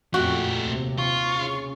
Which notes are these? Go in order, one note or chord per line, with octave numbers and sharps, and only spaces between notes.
F2 A#2 A3 F#4 G4
D#2 C3
F4 C#6
C#3